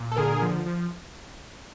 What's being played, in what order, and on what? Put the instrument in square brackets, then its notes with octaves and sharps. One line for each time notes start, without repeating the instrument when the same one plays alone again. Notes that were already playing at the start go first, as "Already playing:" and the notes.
Already playing: [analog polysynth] A#2
A4
D3 G#4 A#4
F3
F3